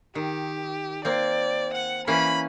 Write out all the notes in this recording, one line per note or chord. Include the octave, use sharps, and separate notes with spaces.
D#3 G4
A#3 C4 D5
F#5
E3 A#3 C#4 B5